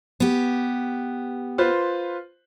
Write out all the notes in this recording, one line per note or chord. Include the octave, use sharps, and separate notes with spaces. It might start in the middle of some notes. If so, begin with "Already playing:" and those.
B3 G4
F4 B4 C5